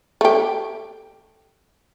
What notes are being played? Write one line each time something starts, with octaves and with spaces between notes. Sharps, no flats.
A3 G4